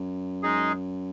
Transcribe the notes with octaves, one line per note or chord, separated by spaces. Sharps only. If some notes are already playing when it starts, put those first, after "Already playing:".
Already playing: F#2
G#3 D#4 G#4